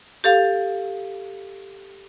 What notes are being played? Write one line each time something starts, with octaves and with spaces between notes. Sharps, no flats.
G4 A4 F5